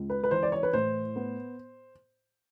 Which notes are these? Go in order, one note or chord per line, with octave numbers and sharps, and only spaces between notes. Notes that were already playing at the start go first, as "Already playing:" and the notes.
Already playing: C#2
B4
B4
E3 C5
D5
C#5
B4
A2 C5
B3